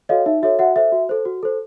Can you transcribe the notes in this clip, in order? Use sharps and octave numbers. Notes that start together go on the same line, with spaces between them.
F#4 A4 C#5 D#5 F5
D#4 E5
F#4 A4 C#5 E5
F#4 E5 F#5
A4 C5 E5
F#4
A4 C5
F#4
A4 C5